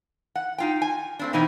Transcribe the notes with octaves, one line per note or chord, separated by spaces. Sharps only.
F#5
D#4 F4 G5
G#5
A3 C4 D4
B2 E3 C4 D#4 E4